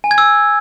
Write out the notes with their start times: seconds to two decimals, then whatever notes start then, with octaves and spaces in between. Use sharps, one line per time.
0.04 G#5
0.11 G#6
0.18 E6